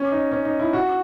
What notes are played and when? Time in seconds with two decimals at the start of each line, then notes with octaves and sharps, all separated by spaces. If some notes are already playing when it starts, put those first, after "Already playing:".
Already playing: C#4
0.12 D#4
0.31 C#4
0.45 D#4
0.59 E4
0.73 F#4